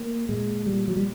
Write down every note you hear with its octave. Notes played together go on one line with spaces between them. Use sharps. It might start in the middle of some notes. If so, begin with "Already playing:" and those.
Already playing: A#3
A#2 G#3
A#2 G3
F#3
G3